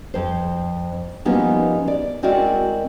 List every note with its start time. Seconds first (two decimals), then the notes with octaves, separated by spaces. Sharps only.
0.14 F2 C5
1.25 F3 G3 A#3 B3 C#4 D#4
1.88 D5
2.23 G#3 C4 E4 F#4 A#4 D5